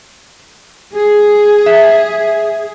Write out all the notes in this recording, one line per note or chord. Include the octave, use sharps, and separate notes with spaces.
G#4
E5